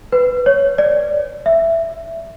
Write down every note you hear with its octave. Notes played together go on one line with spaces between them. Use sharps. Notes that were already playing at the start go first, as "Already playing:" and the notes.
B4
C#5
D5
E5